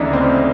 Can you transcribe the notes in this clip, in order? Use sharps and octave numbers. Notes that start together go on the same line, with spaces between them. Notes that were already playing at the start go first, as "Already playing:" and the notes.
Already playing: D2 C#3 E3 D4 D#4
C4